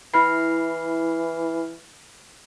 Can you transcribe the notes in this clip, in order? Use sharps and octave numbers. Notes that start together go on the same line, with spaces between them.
E3 E4 B5 F6 C7